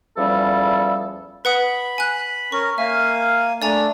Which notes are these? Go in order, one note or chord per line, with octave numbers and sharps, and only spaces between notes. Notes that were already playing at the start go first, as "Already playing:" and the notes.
E2 F3 G3 C#4 A4
B4 F#5 B5 D#6
G#5 F#6
C#4 A#4 C#6
A#3 E5 F5 G#5
A3 D4 D5 G#5 A#5